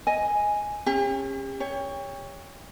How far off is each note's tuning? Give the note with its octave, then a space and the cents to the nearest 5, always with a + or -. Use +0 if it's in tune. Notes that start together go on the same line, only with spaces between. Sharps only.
D#5 +10 G#5 +0
C#4 -25 G4 +45
G4 +35 C#5 +10